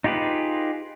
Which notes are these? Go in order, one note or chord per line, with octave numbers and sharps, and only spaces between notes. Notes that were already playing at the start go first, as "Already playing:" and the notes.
D#4 F4 G4 G#4 B4